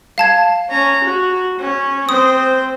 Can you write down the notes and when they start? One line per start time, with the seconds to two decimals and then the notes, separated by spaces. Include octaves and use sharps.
0.18 F5 A5 G#6
0.69 C#4 A#5
1.04 F#4
1.59 C#4
2.09 C4 C5 D#6